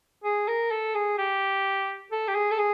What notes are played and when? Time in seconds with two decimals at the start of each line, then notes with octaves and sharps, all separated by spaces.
0.24 G#4
0.48 A#4
0.71 A4
0.95 G#4
1.18 G4
2.11 A4
2.28 G4
2.35 G#4
2.51 A4
2.58 G#4